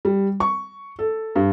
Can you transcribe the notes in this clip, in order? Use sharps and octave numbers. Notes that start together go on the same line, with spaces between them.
G3
C#6
A4
G2